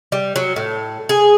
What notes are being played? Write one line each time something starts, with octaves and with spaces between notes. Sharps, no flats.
G3
F#3
A2
G#4